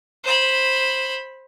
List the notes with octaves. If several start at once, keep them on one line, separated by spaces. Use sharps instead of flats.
C5 B5